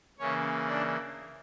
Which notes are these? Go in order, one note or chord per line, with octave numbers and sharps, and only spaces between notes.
C#3 E3 A#3 C#4 C#5
D4 D5